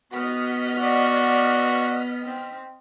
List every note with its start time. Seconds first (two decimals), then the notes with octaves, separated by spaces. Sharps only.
0.12 B3 F#4 D#5 F6 B6
0.77 F#4 D5
2.23 C4